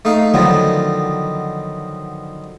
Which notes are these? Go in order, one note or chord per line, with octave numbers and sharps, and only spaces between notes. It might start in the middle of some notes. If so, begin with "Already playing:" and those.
A3 D#4 F5
D3 D#3 F3 F#3 B3